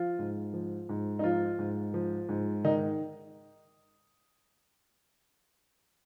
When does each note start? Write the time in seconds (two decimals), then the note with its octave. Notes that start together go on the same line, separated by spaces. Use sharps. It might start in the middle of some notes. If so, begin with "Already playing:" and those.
Already playing: F3 F4
0.19 G#2
0.53 F3
0.89 G#2
1.19 D#4
1.24 F3 F4
1.59 G#2
1.94 F3
2.29 G#2
2.64 D#3 D#4